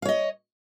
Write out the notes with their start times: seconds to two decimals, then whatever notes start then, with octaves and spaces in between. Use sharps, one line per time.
0.02 F5
0.05 C#5
0.09 D#5